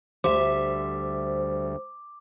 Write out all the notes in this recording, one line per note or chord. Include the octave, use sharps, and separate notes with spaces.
D2 G3 C5 E5 D6